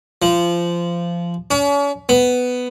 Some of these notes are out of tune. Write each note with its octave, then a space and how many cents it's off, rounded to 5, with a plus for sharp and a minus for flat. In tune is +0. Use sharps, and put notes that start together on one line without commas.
F3 -20
C#4 +40
B3 +10